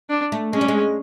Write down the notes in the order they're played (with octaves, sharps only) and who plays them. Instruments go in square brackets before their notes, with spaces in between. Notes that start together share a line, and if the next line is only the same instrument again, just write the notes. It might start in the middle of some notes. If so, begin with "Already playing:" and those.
[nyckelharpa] D4
[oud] A3
[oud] G#3 [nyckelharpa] C#4
[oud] G3
G#3